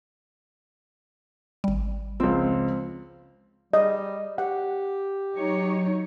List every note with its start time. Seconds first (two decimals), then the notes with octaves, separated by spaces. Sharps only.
1.64 G#1 G3
2.20 C#2 F3 C4
3.73 G3 D#5
4.38 G4 F#5
5.36 F#3 D#4 C#5